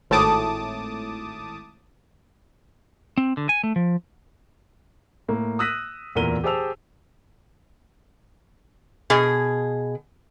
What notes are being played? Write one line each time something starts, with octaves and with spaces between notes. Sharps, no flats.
G#1 A2 A3 A5 D6 D#6
C4
D3
G#5
A3
F3
A2 A#3
D#6 E6 F#6 A#6 B6 D#7
D1 E2 A#2 A#4 D#7 G7
G4 G#4 C5 A5 E6 F7
B2 G#4